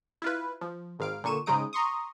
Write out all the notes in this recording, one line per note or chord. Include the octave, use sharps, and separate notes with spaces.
E4 F4 B4
F3
G#1 G#2 F5 D7
A#2 D3 C#6 D#7 E7
G#2 C#3 G#3 D#4 D#6 D7
A#5 C6 C#6 D#6